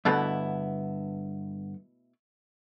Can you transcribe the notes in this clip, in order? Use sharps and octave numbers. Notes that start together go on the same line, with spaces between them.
G2 B2 D3 A3 B3 E4